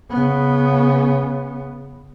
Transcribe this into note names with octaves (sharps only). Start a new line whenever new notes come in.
C#3 B3